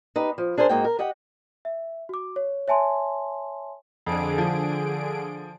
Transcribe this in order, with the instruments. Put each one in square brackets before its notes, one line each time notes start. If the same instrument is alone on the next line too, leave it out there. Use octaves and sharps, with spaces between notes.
[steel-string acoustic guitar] D#4 G4 B4
F3
D4 G#4 A#4 C5
G#2 G#3 A#3 D#4 F#4 G5
A#4
G4 D#5 F#5 G5
[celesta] E5
F#4 D6
C#5
C#5 E5 G#5 A5 C6
[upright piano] F2 [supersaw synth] D3 G#4 D7
[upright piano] F3